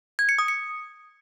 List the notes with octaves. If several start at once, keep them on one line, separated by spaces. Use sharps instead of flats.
G#6
C#7
D#6
C#7